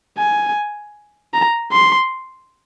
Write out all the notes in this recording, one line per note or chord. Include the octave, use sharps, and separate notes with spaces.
G#5
A#5
C6